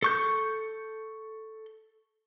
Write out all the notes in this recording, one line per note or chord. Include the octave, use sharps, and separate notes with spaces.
A4 C#6 G6